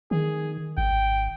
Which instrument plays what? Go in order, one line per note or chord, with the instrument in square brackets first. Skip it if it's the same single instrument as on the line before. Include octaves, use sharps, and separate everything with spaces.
[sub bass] D#3 [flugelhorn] G#4
[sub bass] G#1 [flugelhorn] G5